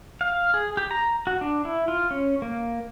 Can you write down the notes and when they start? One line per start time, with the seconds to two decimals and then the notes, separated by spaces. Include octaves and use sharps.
0.21 F5
0.54 G#4
0.77 G4
0.91 A#5
1.27 F#4
1.41 D4
1.65 E4
1.88 F4
2.11 C#4
2.42 A#3